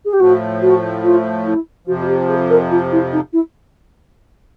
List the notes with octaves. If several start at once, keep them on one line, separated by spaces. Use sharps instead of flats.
G#4
G4
A2 F3 A3 F#4
F#4
F4
E4
F2 C3 F3 F#4
F#4
G4
G#4
A#4
F4
E4
D#4
E4